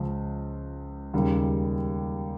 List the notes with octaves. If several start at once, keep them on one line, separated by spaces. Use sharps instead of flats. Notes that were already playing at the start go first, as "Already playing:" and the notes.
Already playing: C#2 C#3 F3
D#2 C#3 G3